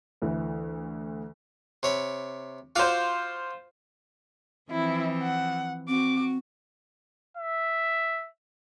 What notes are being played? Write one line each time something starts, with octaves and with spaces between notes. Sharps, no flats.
D2 E3
C3 C#5 B5
F4 F#4 C5 F5 D6
E3 F3 C4 E4
F#5
C4 F#4 D6
E5